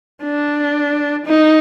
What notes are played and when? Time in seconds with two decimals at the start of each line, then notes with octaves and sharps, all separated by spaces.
0.23 D4
1.26 D#4